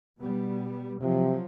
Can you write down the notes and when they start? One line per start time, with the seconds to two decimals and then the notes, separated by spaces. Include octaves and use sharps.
0.19 B2 G3 B3
1.01 C3 F3 F#3